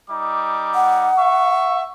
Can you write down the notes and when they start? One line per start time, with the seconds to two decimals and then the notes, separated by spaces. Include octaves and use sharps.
0.10 G3 D#4 D6
0.75 F#5
1.17 E5 C#6